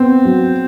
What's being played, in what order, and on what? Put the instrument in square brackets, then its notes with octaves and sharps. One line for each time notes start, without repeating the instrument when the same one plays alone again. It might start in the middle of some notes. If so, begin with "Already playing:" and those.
Already playing: [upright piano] B3 [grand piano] C4
[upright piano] F#3